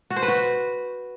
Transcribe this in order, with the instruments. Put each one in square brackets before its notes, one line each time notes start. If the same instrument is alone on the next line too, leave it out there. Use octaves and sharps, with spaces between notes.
[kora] F#4
C5
B4
F#4